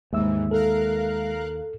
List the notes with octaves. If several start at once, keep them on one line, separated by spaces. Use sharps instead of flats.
D#2 G#2 E3 G#3 E5 E6
A4 A#4 F5 F#6